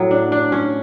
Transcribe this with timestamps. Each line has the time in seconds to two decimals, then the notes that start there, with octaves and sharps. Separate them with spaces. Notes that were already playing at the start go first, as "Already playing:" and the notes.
Already playing: A2 F#3
0.11 D4
0.32 D4
0.52 C#4